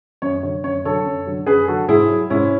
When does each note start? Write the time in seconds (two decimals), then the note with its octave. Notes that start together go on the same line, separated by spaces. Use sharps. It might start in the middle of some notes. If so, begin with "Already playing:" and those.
0.22 F#2 C#5
0.43 D3 F#3 C#5
0.64 F#2 C#5
0.84 D3 F#3 A4 C#5
1.05 F#2
1.26 D3 F#3
1.47 F#2 G#4 B4
1.68 D3 F#3 F#4 A4
1.88 G#2 E4 G#4
2.09 F#3
2.30 G#2 C#4 E4